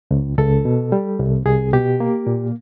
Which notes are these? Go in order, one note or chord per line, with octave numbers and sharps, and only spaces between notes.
C#2
C#2 A4
B2
G3
C2
C2 G#4
B2 G4
A#3
A#2